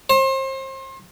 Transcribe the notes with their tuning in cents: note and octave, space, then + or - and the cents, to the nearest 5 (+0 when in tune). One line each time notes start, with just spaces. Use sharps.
C5 +35